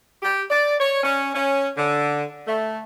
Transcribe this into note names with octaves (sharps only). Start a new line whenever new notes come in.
G4
D5
C#5
C#4
C#4
D3
A3